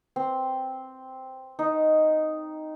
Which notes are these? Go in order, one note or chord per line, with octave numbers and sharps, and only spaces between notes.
C4
D#4